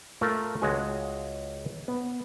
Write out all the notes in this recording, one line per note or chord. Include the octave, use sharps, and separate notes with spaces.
A3 F4 A#4
C#2 G#3 F#4 G#5
B3